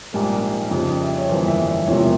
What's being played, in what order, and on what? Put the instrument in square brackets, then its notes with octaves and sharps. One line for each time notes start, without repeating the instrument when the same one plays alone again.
[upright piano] A#1 G#2 G3 A#3
F2 C#3 G3
E5
C#5
G1 F2 E3 G3 A#3 C5
E5
E5
E1 E2 C3 F3 A#3 C#5